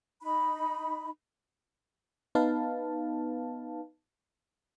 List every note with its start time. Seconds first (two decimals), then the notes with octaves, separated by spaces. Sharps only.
0.22 D#4 B5
2.35 B3 D#4 B4 F5 A5